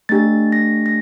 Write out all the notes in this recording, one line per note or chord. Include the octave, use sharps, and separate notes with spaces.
A3 D4 G4 A6
A#6
A#6